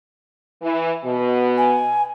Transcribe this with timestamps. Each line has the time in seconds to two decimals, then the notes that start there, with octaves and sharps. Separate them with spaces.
0.62 E3
1.05 B2
1.57 G#5